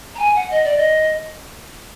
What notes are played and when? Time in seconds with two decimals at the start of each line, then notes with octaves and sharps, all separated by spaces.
0.15 A#5
0.19 G#5
0.35 F#5
0.50 D#5
0.64 D5
0.77 D#5